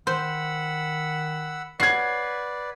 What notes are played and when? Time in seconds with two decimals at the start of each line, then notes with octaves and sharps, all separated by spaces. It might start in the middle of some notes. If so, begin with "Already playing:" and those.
0.07 D#3 C5 F#5 B5 E6
1.80 F#4 B4 C#5 D5 G#6 C7